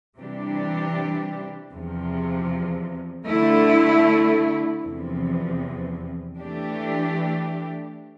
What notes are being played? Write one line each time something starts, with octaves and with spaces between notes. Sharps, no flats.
C3 E3 G3 D4 G4
E2 C3 F3
D3 A3 E4
E2 C3 F3
E3 A3 D4 G4